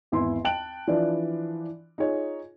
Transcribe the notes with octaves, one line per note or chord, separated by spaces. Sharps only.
G#1 E2 E4 C6
G5 A5 F#6 D7 F#7
E3 F3 D4 E4 D5
D#4 F4 G#4 C#5